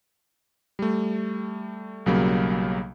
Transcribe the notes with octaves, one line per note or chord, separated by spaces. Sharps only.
G3 A3
B1 C#3 F#3 G3 A#3